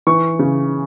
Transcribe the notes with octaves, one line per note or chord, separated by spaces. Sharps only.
E3 C#6
C#3